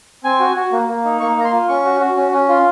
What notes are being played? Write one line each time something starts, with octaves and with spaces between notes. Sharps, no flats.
C4 G#5
F#4
F#4
A#3
A#3
D#4
A#3 C#6
A#3 A#5
C6
F4
C#4 C#6
F#4
F#4
C#4
C#4
F4